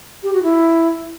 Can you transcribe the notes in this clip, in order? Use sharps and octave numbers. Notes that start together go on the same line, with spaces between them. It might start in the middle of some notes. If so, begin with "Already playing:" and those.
G4
F#4
E4